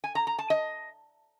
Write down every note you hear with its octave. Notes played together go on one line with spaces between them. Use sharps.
G#5
A#5
A#5
A5
D#5